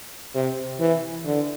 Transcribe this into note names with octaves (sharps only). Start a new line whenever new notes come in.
C3
E3
D3